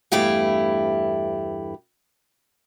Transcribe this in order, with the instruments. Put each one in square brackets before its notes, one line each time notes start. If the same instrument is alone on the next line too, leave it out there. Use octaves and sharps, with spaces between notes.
[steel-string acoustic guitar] E2 G2 A3 E4 G4 F5